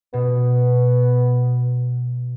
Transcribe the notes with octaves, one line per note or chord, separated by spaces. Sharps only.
B2 B3